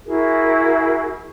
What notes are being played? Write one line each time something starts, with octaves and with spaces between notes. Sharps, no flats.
E4 F#4 G#4 A#4